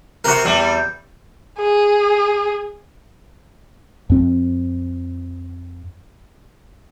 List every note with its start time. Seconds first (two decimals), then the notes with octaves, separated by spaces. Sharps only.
0.24 C3 F#4 A#4
0.45 E2 G3
1.58 G#4
4.10 F2 C4